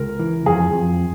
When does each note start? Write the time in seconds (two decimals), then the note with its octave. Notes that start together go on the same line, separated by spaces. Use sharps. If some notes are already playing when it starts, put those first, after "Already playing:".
Already playing: C#2 A#4
0.19 E3
0.46 F2 G#4
0.73 F2